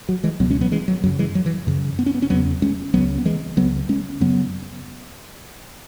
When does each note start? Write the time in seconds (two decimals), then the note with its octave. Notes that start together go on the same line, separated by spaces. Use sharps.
0.09 F#3
0.24 E3 G#3
0.40 C#2 B2 F#3 B3
0.51 G#3 C#4
0.61 F#3 B3
0.71 E3 G#3
0.88 F#3
1.03 F#2 F#3
1.06 C#3
1.19 E3 G#3
1.35 F#3
1.46 E3
1.67 F#2 C#3
1.99 B3
2.06 C#4
2.14 B3
2.22 C#4
2.30 E2 C#3 F#3 B3
2.62 G#3 C#4
2.94 C#2 C#3 F#3 B3
3.18 B3
3.25 E3 G#3
3.57 C#2 C#3 F#3 B3
3.89 G#3 C#4
4.20 F#2 C#3 F#3 B3